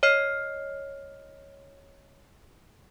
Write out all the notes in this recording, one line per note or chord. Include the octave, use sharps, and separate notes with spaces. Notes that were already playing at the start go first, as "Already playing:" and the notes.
C#5 D#5 F6 C7